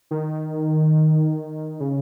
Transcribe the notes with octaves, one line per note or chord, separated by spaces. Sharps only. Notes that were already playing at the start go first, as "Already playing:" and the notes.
D#3
C#3